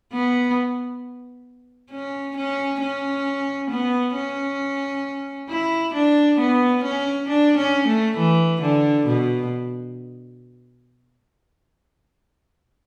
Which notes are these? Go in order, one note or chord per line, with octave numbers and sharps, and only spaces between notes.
B3
C#4
C#4
C#4
B3
C#4
E4
D4
B3
C#4
D4
C#4
A3
E3
D3
B2